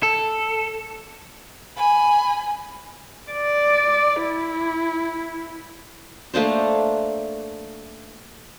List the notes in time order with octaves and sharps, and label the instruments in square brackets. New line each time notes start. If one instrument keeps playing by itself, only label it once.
[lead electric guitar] A4
[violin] G#5 B5
[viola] D5
E4
[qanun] A3 A#3 D4 C5